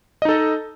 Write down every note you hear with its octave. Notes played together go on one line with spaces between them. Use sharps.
D#4 A4 D#5